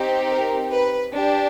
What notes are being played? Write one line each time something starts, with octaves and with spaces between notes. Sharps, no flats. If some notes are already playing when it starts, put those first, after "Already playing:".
Already playing: C4 D#4 G4
A#4
B4
D4 G4